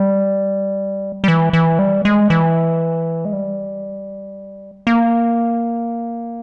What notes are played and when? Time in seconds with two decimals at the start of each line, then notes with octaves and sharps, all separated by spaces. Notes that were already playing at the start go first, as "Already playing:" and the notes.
Already playing: G3
1.24 G3
1.28 E3
1.53 E3
1.79 G3
2.05 G#3
2.30 E3
3.25 G#3
3.33 G3
4.87 A#3